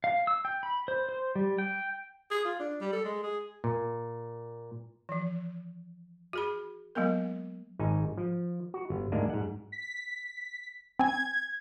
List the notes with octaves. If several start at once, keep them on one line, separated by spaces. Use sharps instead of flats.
F5
E6
G5
B5
C5
C5
G3
G5
G#4
F4
D4
G3
A4
G#3
G#4
A#2
E3 F3
F#4 G#4 B5
F#3 G#3 A#3 B3 A#4
G#1 D#4 G#5
F3
F#4
G1
D2 G#2 G#3 A#3 D4
G#2 F#5
B6
C4 G#5 G#6